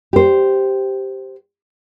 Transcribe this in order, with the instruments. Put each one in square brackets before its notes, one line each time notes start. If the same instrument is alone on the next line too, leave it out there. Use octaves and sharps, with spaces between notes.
[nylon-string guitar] G4 C5